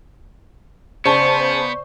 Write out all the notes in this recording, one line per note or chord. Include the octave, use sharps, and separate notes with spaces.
C#3 B3 C5 D5 A5 C#6